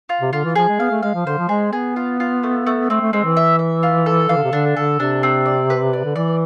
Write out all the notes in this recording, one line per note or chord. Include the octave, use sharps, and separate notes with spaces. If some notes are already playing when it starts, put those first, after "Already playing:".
F4
C3
D3 F4
E3
F3 G#4
G#3
B3 F5
A3
G#3 F5
F3
D3 C5
F3
G#3 G#4
B3 G#4
F4
F4
A3
A3
A3 C4
A3
G#3 C4
E3
E5
E5
F4
A4
E3 F5
D3
C3
D3 D4
D3 A4
C3 D4
C4
D5
B4
D5
D3
E3 D5